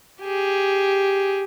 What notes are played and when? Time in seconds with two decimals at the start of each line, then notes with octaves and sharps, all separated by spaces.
0.22 G4 G#4